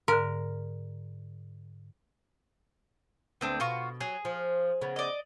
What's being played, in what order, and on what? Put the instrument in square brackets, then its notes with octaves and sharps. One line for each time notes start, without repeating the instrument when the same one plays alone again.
[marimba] G#2 D3 [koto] A#4
[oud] D2 [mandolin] B3 C4 D4
[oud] B2 [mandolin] F4 F#4 C#6
[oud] F#3 [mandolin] G#4
[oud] F3
C#3 B3
[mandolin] D5 D#5